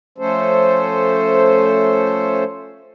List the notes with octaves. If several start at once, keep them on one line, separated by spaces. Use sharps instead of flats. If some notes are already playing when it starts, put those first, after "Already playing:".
F3 A3 C#4 A4 C5